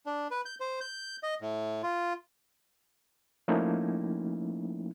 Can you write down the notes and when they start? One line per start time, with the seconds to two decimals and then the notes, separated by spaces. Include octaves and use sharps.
0.06 D4
0.31 B4
0.45 G6
0.60 C5
0.81 G6
1.23 D#5
1.41 A2
1.83 F4
3.48 F3 A3 A#3 C#4 D#4 E4